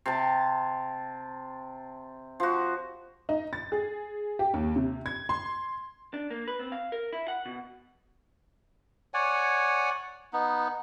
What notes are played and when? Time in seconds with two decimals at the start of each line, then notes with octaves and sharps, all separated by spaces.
0.06 C3 A5
2.40 F3 F#4
3.29 D#4
3.53 A6
3.72 G#4
4.39 G4
4.54 D#2
4.76 C3
5.06 G#6
5.29 C6
6.14 D4
6.30 A#3
6.48 B4
6.59 C4
6.72 F5
6.92 A#4
7.13 E4
7.28 F#5
7.46 B2
9.14 C#5 D5 F#5 G#5
10.33 B3 D#4